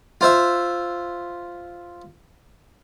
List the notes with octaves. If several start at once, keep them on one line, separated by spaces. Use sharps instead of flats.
F4 C5 E5